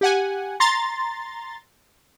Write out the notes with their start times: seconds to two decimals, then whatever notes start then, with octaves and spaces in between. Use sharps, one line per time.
0.01 G4 F#5 G#5
0.60 A#5 C6 A6